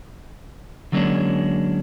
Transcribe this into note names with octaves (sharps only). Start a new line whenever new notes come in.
D3 F#3 G#3 A#3 C#4 D4